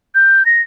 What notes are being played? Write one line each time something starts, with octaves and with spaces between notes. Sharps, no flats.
G6
A#6